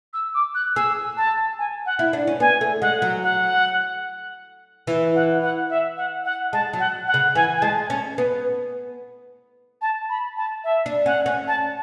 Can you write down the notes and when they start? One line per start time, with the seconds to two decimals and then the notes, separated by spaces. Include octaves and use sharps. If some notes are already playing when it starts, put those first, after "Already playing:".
0.14 E6
0.35 D6
0.55 F#6
0.75 G#4 E6
1.17 A5
1.59 G#5
1.86 F#5
1.99 E4
2.13 D4
2.27 C#4
2.40 B3 G#5
2.61 A3
2.81 G#3 F#5
3.02 F#3
3.23 F#5
4.87 E3
5.15 F#5
5.43 F#5
5.70 E5
5.97 F#5
6.25 F#5
6.53 G#3 A5
6.73 F#3
6.80 F#5
7.07 F#5
7.14 C#3
7.35 E3 G#5
7.58 G#5
7.62 G#3 A5
7.90 C#4
8.18 B3
9.82 A5
10.10 B5
10.37 A5
10.64 E5
10.86 D4
11.06 C#4 F#5
11.26 C#4
11.48 A5